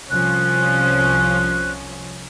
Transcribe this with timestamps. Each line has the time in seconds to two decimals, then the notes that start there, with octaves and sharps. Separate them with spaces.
0.10 C2 F3 C#4 F#6